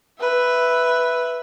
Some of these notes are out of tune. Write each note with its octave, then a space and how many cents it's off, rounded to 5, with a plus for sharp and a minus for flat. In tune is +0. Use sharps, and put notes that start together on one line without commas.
B4 +0 E5 +0